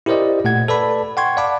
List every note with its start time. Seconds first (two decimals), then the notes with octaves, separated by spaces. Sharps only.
0.06 E4 G4 A#4 C5 D5 D#5
0.44 A#2 A3 F#5 G#6
0.68 A4 B4 D5 A5 B5
1.17 F#5 G5 C6 C#6 G#6
1.37 D5 F5 F#5 A5 B5 D6